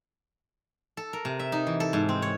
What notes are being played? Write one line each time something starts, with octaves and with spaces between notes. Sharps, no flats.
A4
A#4
C3
E5
D#4
E3
A4
G#2
C4
C#5